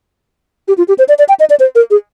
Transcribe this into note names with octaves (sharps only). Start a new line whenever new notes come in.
G4
F4
G4
C5
D5
D5
G5
D#5
D5
C5
A#4
G#4